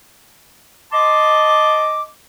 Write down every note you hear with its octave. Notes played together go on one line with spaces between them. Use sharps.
D#5 A5 C6 D6